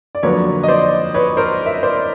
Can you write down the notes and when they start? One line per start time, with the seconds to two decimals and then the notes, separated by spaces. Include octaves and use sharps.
0.15 D5
0.23 F2 D3 F#3 A#3 B4 C#5
0.63 D#5
0.68 C5 D5
1.14 B4 C#5
1.37 A#4 C5
1.66 E5
1.74 D#5
1.83 C5 D5